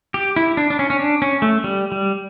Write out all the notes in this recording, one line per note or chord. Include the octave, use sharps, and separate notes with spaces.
G4
E4
D4
D4
C#4
C#4
D4
C#4
A3
G3
G3